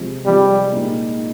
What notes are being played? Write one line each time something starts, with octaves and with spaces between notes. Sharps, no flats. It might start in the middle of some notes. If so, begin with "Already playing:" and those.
Already playing: C3 F3 G#3
C3 F3 G3 G#3
A#2 G#3 D#4